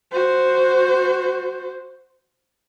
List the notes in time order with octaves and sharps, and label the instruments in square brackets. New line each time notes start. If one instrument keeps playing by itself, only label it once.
[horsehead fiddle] F#4 C5